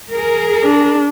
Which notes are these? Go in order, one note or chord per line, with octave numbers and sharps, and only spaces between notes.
G#4 A#4
D4